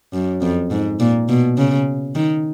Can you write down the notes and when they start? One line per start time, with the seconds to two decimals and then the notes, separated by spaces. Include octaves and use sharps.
0.13 F#2
0.41 F2
0.71 G#2
1.00 A#2
1.29 B2
1.58 C#3
2.15 D#3